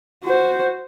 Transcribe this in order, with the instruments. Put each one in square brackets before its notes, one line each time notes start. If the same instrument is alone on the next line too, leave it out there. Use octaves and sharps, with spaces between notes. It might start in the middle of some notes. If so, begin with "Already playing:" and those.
[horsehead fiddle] F#4 C5